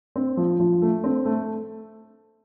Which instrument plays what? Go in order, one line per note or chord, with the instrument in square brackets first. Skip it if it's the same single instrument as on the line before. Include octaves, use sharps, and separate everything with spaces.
[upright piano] C4
F3
F3
A3
C4
A3